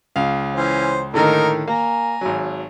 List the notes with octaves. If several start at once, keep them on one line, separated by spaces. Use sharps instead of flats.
C#2 F5
E3 C#4 C5
A2 D3 D#3 A#3 D#4 A#4
A#3 G#5 A#5
G#1 F#3